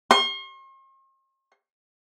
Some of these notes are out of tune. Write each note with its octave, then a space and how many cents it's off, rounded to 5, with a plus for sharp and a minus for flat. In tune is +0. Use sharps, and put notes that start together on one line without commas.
C6 +45